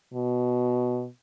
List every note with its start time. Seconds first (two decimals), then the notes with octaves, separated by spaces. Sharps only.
0.14 B2